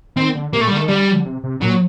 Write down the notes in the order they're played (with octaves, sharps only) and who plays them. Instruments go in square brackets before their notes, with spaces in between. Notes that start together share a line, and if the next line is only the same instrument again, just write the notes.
[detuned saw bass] D#3 [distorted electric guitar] C4
[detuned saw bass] D3
[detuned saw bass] C3 [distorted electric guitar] A#3
[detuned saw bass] A#2 [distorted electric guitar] A3
[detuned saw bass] D3 [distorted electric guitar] G3
[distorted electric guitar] A3
[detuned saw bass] D#3
[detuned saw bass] D3 [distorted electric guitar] G3
[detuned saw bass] D3
C3
C3
[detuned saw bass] A#2 [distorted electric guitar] F#3